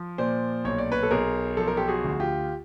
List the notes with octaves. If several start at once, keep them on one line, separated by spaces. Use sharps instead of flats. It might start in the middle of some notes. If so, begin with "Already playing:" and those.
Already playing: F3
A#2 C5 D5
B1 C#5
D5
B4 C#5
A4
B1 G#4 A#4
F3 A4
A#4
G4 A4
F#4 G#4
D2
F4 G4